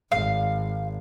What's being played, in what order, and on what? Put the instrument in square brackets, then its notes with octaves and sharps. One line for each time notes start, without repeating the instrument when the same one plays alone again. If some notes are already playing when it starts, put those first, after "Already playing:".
[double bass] G#1 [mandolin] F5